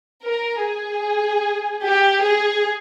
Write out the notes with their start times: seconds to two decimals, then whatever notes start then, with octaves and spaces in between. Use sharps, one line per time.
0.24 A#4
0.63 G#4
1.84 G4
2.24 G#4